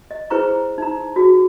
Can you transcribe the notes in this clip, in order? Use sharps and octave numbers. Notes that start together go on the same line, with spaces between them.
D#5
E4 G#4 B4 C5 A#5 C#6
D#4 A#5
F#4 G#4